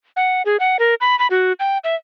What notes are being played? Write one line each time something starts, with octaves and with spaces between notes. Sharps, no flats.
F#5
G#4
F#5
A#4
B5
B5
F#4
G5
E5